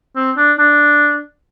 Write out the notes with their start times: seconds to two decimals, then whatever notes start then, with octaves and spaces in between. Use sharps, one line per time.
0.16 C4
0.37 D4
0.59 D4